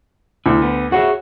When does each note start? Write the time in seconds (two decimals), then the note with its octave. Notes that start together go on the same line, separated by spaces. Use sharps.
0.46 D2 E4
0.62 B3
0.92 F#4 G#4 C#5 E5